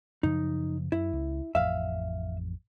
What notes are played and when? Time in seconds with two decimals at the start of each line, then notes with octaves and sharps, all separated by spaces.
0.23 F#2 C#3 F3 D#4
0.92 F#2 E4
1.13 C#2
1.55 A1 F2 E5 F5